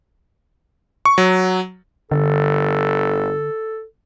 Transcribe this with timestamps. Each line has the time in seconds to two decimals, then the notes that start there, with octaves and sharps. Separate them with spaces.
1.05 C#6
1.18 F#3
2.12 G1 D3 A4